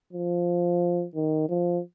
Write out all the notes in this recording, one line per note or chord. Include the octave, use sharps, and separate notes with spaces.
F3
D#3
F3